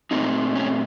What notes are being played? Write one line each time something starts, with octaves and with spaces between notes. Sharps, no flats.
A#2 A3 C4 D#4
C#4